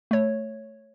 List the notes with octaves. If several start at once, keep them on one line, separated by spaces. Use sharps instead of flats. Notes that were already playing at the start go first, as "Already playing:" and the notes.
A3 C#5